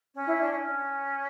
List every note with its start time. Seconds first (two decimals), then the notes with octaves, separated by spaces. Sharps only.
0.13 C#4
0.26 E4
0.39 D4
0.52 C#4